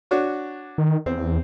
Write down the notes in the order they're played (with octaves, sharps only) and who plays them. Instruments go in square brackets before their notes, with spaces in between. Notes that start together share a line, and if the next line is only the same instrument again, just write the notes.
[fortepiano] D4 F#4 C#5
[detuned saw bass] D#3
[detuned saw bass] E2 [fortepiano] C4